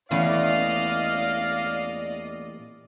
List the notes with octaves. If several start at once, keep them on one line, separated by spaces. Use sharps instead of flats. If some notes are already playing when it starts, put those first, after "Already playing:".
E2 A#2 E3 A3 C#4 D5 D#5 F5